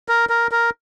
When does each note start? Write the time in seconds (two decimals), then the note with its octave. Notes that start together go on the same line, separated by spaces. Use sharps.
0.09 A#4
0.29 A#4
0.52 A#4